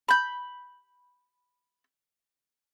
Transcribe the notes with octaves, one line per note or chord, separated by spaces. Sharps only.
B5 G6